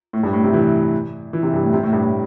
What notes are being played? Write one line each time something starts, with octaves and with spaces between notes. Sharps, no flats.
A2
G2
A2
C3
E3
E3
C3
G2
A2
C3
A2
G2
A2